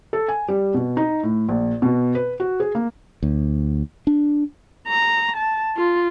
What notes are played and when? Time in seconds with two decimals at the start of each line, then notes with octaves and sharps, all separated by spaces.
0.13 A4
0.28 G#5
0.48 G3
0.74 B2
0.97 D#4
1.23 A2
1.49 A#1
1.82 B2
2.15 B4
2.40 F#4
2.60 G#4
2.75 A#3
3.23 D2
4.07 D4
4.88 A#5
5.36 A5
5.77 F4